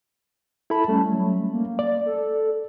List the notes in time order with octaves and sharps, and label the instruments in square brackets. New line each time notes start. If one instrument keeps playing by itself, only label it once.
[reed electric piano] E4 A4 B5 [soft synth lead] A5
[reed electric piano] G3 A3 C#4
[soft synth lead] F#3
A#3
[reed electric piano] D5
[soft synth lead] A4